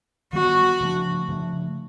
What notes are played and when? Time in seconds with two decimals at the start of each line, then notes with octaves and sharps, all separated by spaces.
0.33 D#3 G3 B3 F#4
0.81 C#3 F3 A3 D4
1.29 C#3 F3 A3 D4